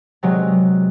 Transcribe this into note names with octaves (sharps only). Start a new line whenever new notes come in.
C3 F#3 G#3